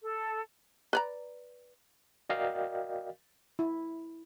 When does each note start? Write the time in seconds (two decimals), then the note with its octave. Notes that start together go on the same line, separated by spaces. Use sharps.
0.02 A4
0.93 B4 D5 A#5
2.29 F#4 A#4 D5 D#5 F5 G5
3.59 E4